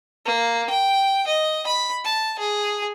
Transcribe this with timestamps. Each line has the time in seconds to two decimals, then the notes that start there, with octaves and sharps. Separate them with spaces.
0.26 A#3
0.70 G5
1.27 D#5
1.67 B5
2.05 A5
2.39 G#4